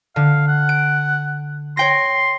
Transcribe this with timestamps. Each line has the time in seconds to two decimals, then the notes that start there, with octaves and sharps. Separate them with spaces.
0.16 D3 F5
0.48 F#5
0.69 D7
1.77 C#5 G5 C6 A#6